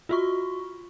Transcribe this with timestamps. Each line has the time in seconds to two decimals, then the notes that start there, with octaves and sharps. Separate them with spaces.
0.09 F4 F#4 C#6